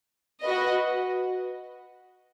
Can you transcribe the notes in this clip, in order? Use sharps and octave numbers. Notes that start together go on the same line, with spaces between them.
F#4 B4 D#5